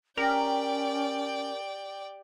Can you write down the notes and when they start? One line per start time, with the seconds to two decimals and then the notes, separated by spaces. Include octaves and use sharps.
0.17 C#4 G4 A#4 D5 G5